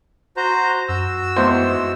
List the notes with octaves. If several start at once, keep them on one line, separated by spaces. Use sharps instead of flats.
F#4 C5 A#5
F#2 F#4 E6
G#1 E2 C5